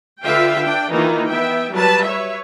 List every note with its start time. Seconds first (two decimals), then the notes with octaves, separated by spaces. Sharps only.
0.22 D3 F4 B4 E5 F5 G5
0.62 D4 G5
0.91 D#3 E3 A#3 D#4 F4
1.27 B3 E5 G5
1.72 F#3 G3 B4 A5
2.04 B4 C#5 E5